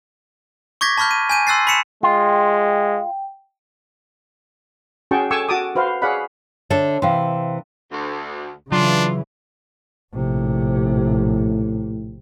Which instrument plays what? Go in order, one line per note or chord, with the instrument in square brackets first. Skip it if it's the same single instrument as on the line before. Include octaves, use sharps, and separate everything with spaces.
[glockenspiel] C#6 D6 G6 G#6 A#6 B6
A5 B5 C#6 F6 G6
D#7
G#5 G6 D#7
C6 E6 F#6 A6 C7
B5 B6 C#7 E7
[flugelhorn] G#3 [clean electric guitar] F4 [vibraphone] G5
[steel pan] C#4 F#4 G#4 G5 A5 C#6
A4 G5 G#5 C#6 D6 E6
F#4 A5 D6 D#6
F#4 B4 C5 F5
G#4 C#5 D5 F5 F#5 B5
[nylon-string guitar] D3 A4 E5 [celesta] C#5
[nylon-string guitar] C3 E3 [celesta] F5 G5 C6
[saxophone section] D2
[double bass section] C#3 E3 [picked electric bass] F#3 [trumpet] D4 [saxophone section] F4
[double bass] A#1 C3 [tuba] A2